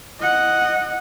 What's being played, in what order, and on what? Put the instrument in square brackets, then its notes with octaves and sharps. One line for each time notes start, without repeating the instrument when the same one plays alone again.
[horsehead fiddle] D#5 F#5